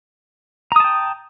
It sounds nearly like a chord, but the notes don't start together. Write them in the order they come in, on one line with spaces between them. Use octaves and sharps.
A#5 D#6 A5 G5